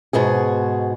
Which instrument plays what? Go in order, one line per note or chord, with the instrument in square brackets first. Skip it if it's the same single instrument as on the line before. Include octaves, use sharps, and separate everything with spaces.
[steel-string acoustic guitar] G#2 B2 F#4 G#4